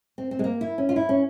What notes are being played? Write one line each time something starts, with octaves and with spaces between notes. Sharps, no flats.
C4
C4
G#3
A#3
E4
C#4
F4
E4
C#4